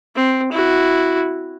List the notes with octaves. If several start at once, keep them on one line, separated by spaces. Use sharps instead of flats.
C4
E4 F#4